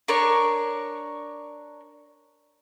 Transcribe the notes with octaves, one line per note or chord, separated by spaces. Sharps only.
D4 A#4 C#5 C#6